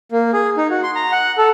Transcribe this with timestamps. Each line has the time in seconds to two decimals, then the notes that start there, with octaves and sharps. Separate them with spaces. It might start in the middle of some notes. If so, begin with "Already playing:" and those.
0.12 A#3
0.33 G#4
0.57 D#4
0.70 F#4
0.83 C6
0.95 A#5
1.12 F#5
1.38 A4